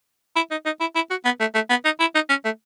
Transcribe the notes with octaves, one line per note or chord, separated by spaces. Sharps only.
E4
D#4
D#4
E4
E4
F#4
B3
A3
A3
B3
D#4
E4
D#4
C#4
A3